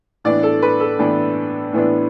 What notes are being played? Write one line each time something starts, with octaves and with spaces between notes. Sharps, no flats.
A2 E3 B3 D4 D5
A4
B4
A4
A2 E3 B3 D4
A2 E3 B3 D4